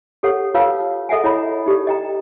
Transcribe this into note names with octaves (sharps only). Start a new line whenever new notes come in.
G4 A4 C#5 F#5
F4 B4 C#5 F5 A5 E6
G#4 A4 D#5 E5 F#5 G#5
E4 C#5 D#5 A#5 B5
D#4 G4 A4 D5
D#5 G5 A#5